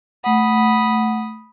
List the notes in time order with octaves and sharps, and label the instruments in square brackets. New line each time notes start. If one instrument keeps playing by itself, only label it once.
[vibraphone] A3 F#5 [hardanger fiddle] B5 D#6